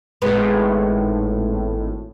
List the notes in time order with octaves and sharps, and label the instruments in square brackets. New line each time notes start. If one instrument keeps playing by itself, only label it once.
[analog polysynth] G#1 A2 [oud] G#3 B3 B4